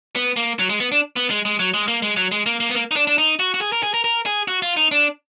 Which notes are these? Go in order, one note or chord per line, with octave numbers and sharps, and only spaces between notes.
B3
A#3
F#3
G#3
B3
D4
B3
G#3
G#3
F#3
G#3
A#3
G#3
F#3
G#3
A#3
A#3
B3
A#3
D#4
D4
D4
D#4
F#4
F#4
G#4
A#4
G#4
A#4
A#4
G#4
F#4
F4
D#4
D4